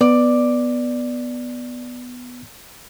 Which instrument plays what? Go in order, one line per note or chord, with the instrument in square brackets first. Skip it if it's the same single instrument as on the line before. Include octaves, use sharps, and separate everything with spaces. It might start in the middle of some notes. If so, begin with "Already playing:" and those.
[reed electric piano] B3 [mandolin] D5